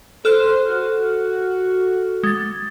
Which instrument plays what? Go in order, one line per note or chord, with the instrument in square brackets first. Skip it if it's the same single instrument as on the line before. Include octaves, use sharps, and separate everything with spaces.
[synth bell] A4 F6 F#6 [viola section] C5
[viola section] F#4
[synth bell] G#3 A6